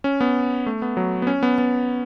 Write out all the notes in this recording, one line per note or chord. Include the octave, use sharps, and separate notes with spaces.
C#4
B3
A3
B3
F#3
B3
C#4
B3
B3